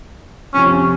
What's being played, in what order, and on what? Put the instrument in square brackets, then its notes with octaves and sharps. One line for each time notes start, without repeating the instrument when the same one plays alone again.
[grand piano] F2 C3 F3 [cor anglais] C#4